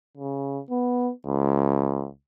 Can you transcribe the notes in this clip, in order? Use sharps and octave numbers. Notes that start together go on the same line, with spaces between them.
C#3
B3
C#2